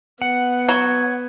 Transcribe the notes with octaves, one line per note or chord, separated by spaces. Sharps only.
B3 F#5
F#3 G#6